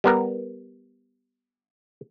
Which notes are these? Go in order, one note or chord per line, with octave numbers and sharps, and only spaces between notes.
G3 B3 A#4